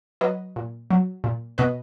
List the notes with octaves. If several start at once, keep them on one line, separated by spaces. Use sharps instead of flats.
F#3 B4 D#5
A#2
F#3
A#2
B2 B4 D#5